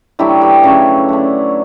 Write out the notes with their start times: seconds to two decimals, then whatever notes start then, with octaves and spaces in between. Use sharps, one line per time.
0.19 D3 F#3 A3 E4 G4
0.41 G4 B4
0.63 C#3 F#3 A3 A4 C#5
1.09 D3 A3